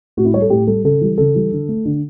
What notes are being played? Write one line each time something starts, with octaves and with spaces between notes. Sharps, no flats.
A2 F#4
E4
G3 C#5
A4
A2 G4
G3 A4
C#3 A4
E3 G3
C#3 A4
E3 G3
D3
A3
D3